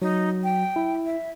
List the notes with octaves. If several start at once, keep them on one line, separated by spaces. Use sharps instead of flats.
F#3 D#4
G5
E4
E5